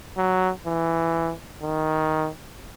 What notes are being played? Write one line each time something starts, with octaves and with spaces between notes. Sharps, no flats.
F#3
E3
D#3